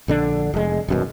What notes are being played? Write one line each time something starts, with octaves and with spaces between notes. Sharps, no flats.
A#1 D3 D4
F1 G#3
D#1 F#2 B2